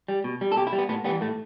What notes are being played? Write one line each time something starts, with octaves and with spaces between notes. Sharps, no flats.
G3
B2
G3
A4
B2 G4
E4
G3
B3
A2 B3
E3 G3 B3
A2 A3